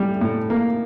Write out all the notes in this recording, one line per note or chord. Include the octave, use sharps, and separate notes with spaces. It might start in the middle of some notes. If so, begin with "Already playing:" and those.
Already playing: A2 G3
A2
A#3